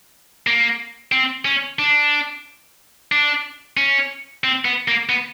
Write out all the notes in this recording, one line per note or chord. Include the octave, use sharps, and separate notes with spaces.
A#3
C4
C#4
D4
D4
C#4
C4
B3
A#3
B3